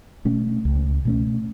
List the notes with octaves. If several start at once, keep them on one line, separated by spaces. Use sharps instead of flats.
B2 A3 C#4
C#2
B2 A3 C#4